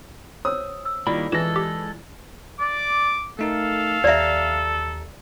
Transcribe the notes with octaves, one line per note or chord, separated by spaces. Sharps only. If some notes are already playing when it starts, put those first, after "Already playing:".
C5 C#5 D#6 E6
E6
D#3 G3 A#3 E4 F4 D5 B5
E3 G#3 E4 G#4 A4 A#6 E7
G4
D5 D6
A3 D#4 A4 A#4 F5
D#2 G4 D5 E5 A#5